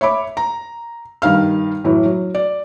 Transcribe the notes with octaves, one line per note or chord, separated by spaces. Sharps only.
C#5 E5 B5 D6
A#5
G2 D#3 F5 F6
A2 E3 F#3
F#3
D5